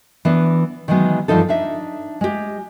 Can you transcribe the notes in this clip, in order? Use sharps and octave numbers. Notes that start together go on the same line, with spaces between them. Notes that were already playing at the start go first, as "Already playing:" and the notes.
E3 B3 D4
D#3 E3 F#3 G#3 B3
G2 E3 F3 C4 D#4 A4
D4 D#4 E5
G#3 G4